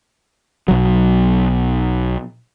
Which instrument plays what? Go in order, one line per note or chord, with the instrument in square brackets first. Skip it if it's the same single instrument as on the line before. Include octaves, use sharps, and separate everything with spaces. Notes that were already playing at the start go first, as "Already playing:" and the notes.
[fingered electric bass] B1 F#3